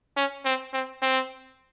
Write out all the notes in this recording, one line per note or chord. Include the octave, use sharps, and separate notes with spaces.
C#4
C4
C4
C4